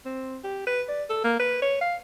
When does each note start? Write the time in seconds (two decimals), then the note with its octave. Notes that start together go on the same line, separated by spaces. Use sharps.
0.06 C4
0.44 G4
0.67 B4
0.89 D5
1.10 A4
1.24 A#3
1.40 B4
1.62 C#5
1.81 F5